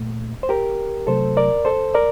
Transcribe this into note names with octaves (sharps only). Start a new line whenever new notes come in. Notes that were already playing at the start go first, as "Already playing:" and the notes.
Already playing: A#2 A3
C5
G4 A#4
C3 F#3 A3 A4 C5
A#4 D5
A4 C5
A#4 D5